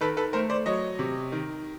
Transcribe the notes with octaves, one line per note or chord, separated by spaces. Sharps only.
D#3 A4 B4
A4 B4
A3 A#4 C5
C5 D5
F#3 C#5 D#5
C3
D#3